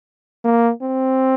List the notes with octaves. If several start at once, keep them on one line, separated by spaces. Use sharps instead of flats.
A#3
C4